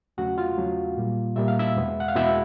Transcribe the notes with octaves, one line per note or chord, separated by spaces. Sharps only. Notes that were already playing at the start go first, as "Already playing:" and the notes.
E2 C#3 F#3 A3 F#4 F#5
F4 F5
E2 C#3 F#3 A3
A#2 G3 A#3
A#2 G3 A#3 E5
F5
E4 E5
E2 B2 G#3 B3
F#5
F5
E2 B2 G#3 B3 E4 E5